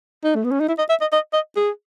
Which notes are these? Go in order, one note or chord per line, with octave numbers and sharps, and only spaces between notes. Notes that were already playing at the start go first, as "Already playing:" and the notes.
D#4
A3
B3
C#4
D#4
E4
D#5
E5
D#5
D#5
D#5
G#4